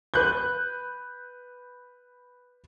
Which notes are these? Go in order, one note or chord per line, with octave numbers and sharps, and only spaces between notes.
B4 F#6 G6